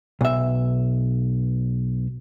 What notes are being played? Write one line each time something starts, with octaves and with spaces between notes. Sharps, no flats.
B1 E5